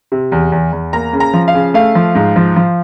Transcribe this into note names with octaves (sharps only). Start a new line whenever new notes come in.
C3
E2
E2
E2
A#3 A#5
C#3
A#5
F3
F5
C#3
A3 F5
F3
G#2
F3
F3